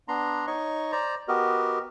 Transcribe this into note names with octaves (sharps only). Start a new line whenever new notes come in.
B3 D4 A#5 C6
D#4 C#5 D#5 C#6
C5 D5 A#5
B3 F#4 G4 A#4 D#5